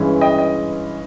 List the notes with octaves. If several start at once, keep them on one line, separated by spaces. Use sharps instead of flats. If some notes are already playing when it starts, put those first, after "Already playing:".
Already playing: G2 E3 G#3 C#4
D#5 G5
D#5